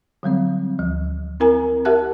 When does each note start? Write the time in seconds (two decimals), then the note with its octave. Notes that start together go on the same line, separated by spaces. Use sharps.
0.23 D3 F#3 G3 C4
0.79 D2 F3
1.40 C4 E4 A#4 G#5 A#5
1.85 G4 A#4 E5 F#5 A5 F#6